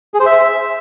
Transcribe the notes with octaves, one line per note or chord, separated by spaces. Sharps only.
G#4
C5
E5